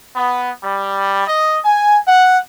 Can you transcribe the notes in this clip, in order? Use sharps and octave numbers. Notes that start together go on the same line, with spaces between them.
B3
G3
D#5
G#5
F#5